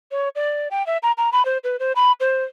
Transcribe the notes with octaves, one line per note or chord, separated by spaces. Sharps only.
C#5
D5
G5
E5
A#5
A#5
B5
C5
B4
C5
B5
C5